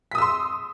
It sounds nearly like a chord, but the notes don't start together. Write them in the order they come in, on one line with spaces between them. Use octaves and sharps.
B6 D#6 E6 C6